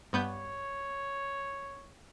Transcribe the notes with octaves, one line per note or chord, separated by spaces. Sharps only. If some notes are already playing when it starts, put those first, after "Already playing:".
G2 B3 C#5 G6